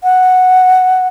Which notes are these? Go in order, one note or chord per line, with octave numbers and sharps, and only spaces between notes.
F#5